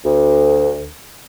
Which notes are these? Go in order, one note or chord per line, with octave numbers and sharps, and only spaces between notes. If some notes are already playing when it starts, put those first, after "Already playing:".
D2